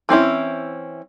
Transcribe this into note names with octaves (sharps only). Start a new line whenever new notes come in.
E3 C4 C#4 E4